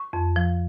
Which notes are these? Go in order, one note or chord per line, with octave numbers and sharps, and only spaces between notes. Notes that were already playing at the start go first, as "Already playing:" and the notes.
Already playing: C#6
F2
F3